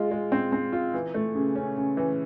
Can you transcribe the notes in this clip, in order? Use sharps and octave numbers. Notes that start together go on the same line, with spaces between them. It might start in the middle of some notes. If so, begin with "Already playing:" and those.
Already playing: G#3 F4
G#3
C4
C4
F4
E3
A3
C#3
C#4
C#3
E3